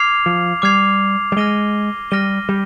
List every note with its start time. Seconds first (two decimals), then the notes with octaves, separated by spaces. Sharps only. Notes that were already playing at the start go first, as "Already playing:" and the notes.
Already playing: D6 F6 G#6 C7 F7
0.26 F3
0.62 G3 D6 F6 G#6 C7 F7
1.32 G3
1.37 G#3 F6 A#6 D#7 G7
2.11 G3 F6 A#6 D#7 G7
2.49 G3